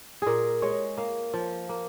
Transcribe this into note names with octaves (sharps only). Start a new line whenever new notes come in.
A#2 G#4 A#4
G#3 C#5
A#3 F5
F3
A#3